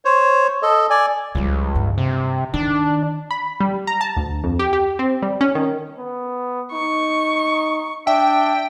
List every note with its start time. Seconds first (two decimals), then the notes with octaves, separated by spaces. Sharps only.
0.05 C5 C#5
0.62 A4 D#5
0.90 D5 G#5
1.35 C#2 F3 G3
1.75 G2
1.98 C3
2.54 D#3 D4
3.31 B5
3.60 G3
3.87 A#5
4.01 A5
4.17 D2
4.44 F2
4.59 G4
4.73 G4
4.99 C4
5.22 G3
5.41 C#4
5.55 D#3
5.98 B3
6.73 D#4 C#6
8.07 D4 E5 G5